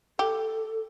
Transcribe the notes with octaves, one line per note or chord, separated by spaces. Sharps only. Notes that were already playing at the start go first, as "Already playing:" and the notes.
G4 A4